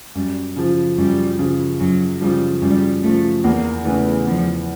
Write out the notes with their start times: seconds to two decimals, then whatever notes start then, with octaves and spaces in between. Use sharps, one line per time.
0.15 F#2 G3
0.56 C#3 F3
0.97 F#2 G3
1.39 C#3 F3
1.80 F#2 F#3
2.21 C#3 F3 G3
2.62 F#2 G3
3.03 C#3 F3 A3
3.44 E2 A#3
3.85 C#3 E3 A3
4.26 E2 F3